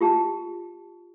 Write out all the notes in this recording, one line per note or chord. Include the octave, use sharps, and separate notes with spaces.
F4 G4 A5